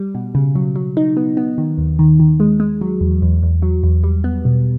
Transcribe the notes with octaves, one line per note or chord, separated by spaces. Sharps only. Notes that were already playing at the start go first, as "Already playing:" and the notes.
Already playing: G3
B2
C#3
F#3
F#3
D#4
B3
B3
D#3
D#2
D#3
D#3
G#3
G#3
F#3
E2
E2
E2
F#3
E2
G3
B3
B2